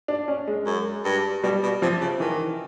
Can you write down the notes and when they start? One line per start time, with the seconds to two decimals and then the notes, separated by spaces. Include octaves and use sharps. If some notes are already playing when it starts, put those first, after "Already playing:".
0.08 D4
0.28 C#4
0.47 G#3
0.66 F#2
1.05 G2
1.43 B2 G3
1.62 B2
1.82 C3 F3
2.01 C#3
2.20 D#3 E3